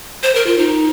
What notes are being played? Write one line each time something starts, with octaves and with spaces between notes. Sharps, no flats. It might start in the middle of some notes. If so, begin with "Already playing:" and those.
C5
A#4
F4
D#4